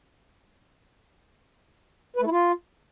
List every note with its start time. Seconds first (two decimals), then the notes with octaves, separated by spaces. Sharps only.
2.16 B4
2.21 A3
2.26 E4
2.31 F4